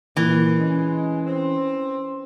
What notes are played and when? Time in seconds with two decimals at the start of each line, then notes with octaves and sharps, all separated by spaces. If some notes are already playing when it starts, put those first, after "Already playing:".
0.17 A#2 E3
0.59 G#3 C#4
1.26 C4